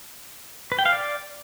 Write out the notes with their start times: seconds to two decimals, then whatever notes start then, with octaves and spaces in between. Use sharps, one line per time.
0.72 B4
0.79 G5
0.86 F5
0.92 D5